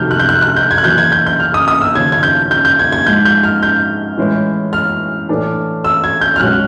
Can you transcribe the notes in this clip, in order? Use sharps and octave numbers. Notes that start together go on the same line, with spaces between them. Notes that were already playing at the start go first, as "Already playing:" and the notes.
Already playing: F2 C3 D#3 F#3 A3 F6 G6
F#6
G6
F#6
F#6
G6
G#6
F#6
F#1 E2 B2 G6
G#6
G6
G6
F6
D#6
D#6
E6
D#2 C#3 F3 G#6
G#6
G6
G6
G6
G#6
G#6
G#2 F3 G#3 G6
G6
F6
G6
A2 E3 G#3 C#4 E4
F6
A2 E3 A3 D4
E6
G#6
G6
F6
B1 B2 G#3 C#4 F#4 F#6